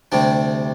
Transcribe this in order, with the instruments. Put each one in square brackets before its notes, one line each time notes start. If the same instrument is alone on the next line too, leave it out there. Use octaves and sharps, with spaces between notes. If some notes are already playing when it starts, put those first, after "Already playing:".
[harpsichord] D2 C3 G3 D4